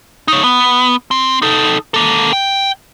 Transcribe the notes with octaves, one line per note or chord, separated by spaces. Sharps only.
D#4 C#5
B3
C4
D#4 A4
A#3 A4
G5